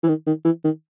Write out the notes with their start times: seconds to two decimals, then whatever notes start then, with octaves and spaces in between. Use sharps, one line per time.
0.03 E3
0.08 D#3
0.27 D#3
0.45 E3
0.64 D#3